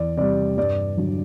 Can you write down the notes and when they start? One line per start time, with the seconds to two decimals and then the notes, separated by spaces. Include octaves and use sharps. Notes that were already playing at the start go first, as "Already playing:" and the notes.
Already playing: E2 D5
0.17 C3 G3 D5
0.57 G2 D5
0.97 D3 F#3